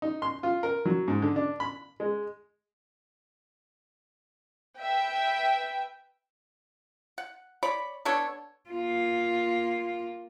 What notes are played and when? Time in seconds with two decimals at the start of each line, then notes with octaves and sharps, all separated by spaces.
0.02 D#4
0.22 C6
0.43 F4
0.63 A#4
0.85 F#3
1.08 G#2
1.22 D3
1.36 D4
1.60 B5
2.00 G#3
4.78 B4 E5 G5
7.18 F#5
7.63 C#5 D5 B5
8.05 B3 D4 A4 C#5
8.70 A#3 F4